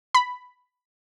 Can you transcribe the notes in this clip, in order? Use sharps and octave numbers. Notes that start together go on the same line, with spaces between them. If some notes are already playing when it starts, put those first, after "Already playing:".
B5